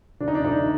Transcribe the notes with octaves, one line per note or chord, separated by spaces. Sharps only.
D2 D4
D#4
D4
D2 D#4